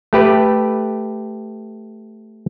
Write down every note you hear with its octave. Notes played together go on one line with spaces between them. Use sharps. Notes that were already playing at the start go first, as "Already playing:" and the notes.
A3 G4 B4